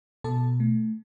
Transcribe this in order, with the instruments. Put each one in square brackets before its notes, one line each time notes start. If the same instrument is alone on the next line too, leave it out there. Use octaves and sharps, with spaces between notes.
[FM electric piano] B2 A4 A5
A3